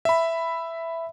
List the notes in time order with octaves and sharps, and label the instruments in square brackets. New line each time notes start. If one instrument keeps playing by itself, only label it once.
[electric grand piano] E5 B5